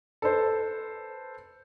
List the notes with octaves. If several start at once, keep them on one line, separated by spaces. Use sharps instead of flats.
A4 B4 C5